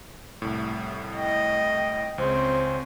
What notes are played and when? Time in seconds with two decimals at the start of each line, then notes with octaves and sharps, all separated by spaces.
0.42 C2 A2
1.17 D#5 G5
2.18 C#2 G#3 C4 C#4 C5